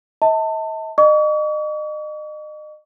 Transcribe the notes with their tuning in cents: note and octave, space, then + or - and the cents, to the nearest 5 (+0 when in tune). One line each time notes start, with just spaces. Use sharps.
D#5 +45 A5 +25
D#5 -35 C#6 +45